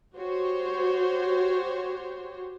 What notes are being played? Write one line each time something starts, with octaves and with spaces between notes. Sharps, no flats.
F#4 G4 C5 C#5